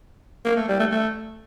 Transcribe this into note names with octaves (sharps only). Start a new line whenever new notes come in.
A#3
A3
G3
A3
A3